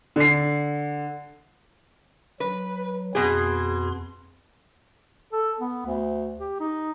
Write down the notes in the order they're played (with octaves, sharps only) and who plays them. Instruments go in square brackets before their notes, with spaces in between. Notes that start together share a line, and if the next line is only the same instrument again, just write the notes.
[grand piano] D3 C7
[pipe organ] F#3 [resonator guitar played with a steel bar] B4
[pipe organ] F2 C6 [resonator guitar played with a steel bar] B2 G#4
[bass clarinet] A4
B3
D2
G4
D#4